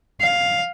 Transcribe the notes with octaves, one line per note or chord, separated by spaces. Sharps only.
F5